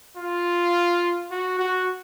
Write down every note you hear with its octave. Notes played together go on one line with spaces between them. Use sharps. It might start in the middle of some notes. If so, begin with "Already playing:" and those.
F4
F#4
F#4